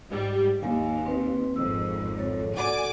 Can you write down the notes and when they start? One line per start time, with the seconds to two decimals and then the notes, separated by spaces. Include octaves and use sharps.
0.11 G#2 G3
0.62 D#2 F5 G#5
1.06 C4 B4
1.56 G#1 F2 E6
2.18 A4 C#5
2.56 F#4 A4 D5 F#5 G#5 D6